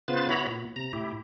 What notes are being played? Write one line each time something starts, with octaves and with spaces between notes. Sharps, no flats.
C#3 B3 F4 B4 C5 A6
B3 E4 F#4 C#5 A#5 B5
A#2
C3 A#5
A2 E4 G4